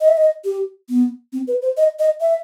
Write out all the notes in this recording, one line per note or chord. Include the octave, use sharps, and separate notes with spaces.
D#5
E5
D#5
G4
B3
C4
B4
C5
D#5
D#5
E5